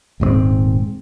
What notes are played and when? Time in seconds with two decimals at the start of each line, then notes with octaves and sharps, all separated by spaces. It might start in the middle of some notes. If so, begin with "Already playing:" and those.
0.20 D#1 G#2 G#3 C4